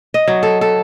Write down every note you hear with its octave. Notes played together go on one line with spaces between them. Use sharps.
D#5
F#3
A4
A4